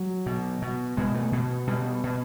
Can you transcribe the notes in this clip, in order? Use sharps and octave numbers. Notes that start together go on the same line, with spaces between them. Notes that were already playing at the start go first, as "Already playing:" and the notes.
Already playing: F#3
B2
B2
B2 G#3
A3
B2
B2 G3
B2